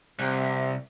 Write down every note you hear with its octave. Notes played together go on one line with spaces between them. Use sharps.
C2 C3